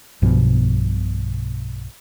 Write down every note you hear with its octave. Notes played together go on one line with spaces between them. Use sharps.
B1 G2 B2 F3